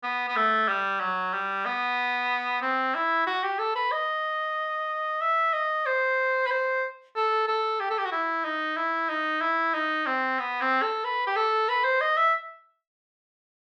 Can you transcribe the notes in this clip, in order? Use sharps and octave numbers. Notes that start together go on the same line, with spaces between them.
B3
B3
A3
G3
F#3
G3
B3
C4
E4
F#4
G4
A4
B4
D#5
E5
D#5
C5
B4
C5
A4
A4
G4
A4
G4
F#4
E4
D#4
E4
D#4
E4
D#4
C4
B3
C4
A4
B4
G4
A4
B4
C5
D#5
E5